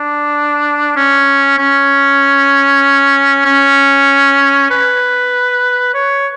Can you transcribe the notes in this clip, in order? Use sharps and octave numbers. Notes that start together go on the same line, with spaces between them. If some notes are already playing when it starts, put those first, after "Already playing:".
Already playing: D4
C#4
C#4
C#4
B4
C#5